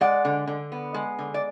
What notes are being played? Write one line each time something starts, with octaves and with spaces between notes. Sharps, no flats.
G#3 D5 F#5
D3
D3
B3
G#3
D3
D5